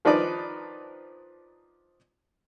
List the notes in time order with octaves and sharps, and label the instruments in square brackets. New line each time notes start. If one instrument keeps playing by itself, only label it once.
[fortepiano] D#3 F3 D4 D#4 B4 D5